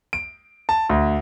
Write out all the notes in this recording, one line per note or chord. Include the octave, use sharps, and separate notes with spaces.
D7
A5
D2